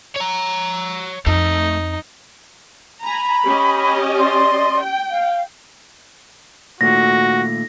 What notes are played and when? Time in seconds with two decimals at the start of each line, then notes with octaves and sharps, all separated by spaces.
0.16 C#5 A#5
1.26 F2 A3 D#4
3.04 G#5 A#5 B5
3.45 C#4 G4 D#5
4.18 D5 C6
4.79 G5
5.10 F5
6.81 A#2 D#3 A3 F#4 A#6